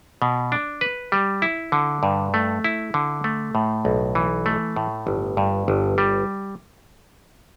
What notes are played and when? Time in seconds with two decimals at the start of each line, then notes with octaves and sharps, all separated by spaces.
0.22 B2
0.52 D4
0.81 B4
1.12 G3
1.42 E4
1.72 D3
2.03 G2
2.34 A3
2.64 E4
2.94 D3
3.24 A3
3.55 A2
3.85 B1
4.15 E3
4.46 A3
4.76 A2
5.07 G1
5.37 G2
5.68 G1
5.98 G3